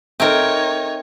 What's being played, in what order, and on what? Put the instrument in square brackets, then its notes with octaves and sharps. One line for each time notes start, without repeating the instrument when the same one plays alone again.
[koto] C4 A#4 [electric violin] D#4 C#5 [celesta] A4 D#5 E5